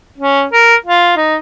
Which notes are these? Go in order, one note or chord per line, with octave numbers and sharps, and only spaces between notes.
C#4
A#4
F4
D#4